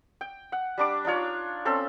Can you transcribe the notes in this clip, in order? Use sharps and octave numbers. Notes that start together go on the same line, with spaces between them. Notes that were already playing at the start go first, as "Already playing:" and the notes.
G5
F#5
G3 D4 D6
D4 D#4 F4 C#5
C4 C#4 A4 C5